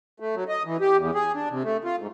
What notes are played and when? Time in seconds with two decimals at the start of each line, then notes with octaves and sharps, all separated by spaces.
0.20 A3
0.35 F#3
0.49 D#5
0.65 E3
0.81 G4
0.97 E2
1.15 G#4
1.35 D4
1.50 C3
1.64 A3
1.85 F4
1.99 G#2